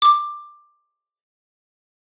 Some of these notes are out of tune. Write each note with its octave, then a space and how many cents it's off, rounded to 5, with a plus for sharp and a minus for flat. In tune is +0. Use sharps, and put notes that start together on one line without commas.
D6 +15